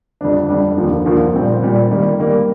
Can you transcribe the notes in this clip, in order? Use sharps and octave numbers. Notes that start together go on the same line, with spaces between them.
F2 D3 G3 D4
F2 D3 G3 D4
D#2 D3 F3 A#3
D#2 D3 F3 A#3
A#2 G3 C4
A#2 G3 C4
D#3 G3 A#3
D#3 G3 A#3